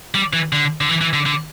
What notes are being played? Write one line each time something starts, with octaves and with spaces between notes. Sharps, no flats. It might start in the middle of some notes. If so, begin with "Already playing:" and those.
G3
E3
D3
D3
E3
E3
D3
D3